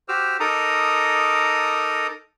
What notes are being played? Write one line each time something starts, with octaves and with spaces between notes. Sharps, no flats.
F#4 G4 C5 D6 E6 F6
D#4 A4 A#4 A#5 D6 D#6